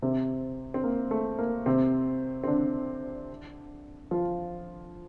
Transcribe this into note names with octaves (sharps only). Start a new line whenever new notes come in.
C3 C4
C4
A#3
A3
A#3
C3 C4
C4
D3 D4
F3 F4